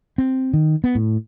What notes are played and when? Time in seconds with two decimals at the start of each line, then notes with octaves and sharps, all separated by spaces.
0.18 C4
0.53 D#3
0.84 B3
0.95 A2